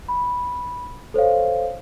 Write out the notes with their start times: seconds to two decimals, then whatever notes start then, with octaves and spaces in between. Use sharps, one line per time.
0.09 B5
1.14 A4 C5 C#5 F5